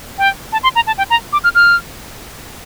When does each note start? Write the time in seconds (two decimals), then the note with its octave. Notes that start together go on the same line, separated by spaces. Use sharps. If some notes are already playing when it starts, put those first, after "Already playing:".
0.18 G5
0.52 A5
0.63 C6
0.76 A#5
0.87 A5
0.98 G5
1.10 A#5
1.33 D6
1.44 F6
1.55 F6